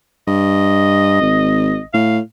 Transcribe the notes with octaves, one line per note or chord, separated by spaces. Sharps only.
G2 D#5
G#1
A2 F5